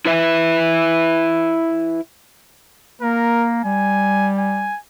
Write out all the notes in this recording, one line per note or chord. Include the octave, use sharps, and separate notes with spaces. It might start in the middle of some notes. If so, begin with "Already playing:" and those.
E4 B4 E5
A#3 A#4
G3 G#5
G#5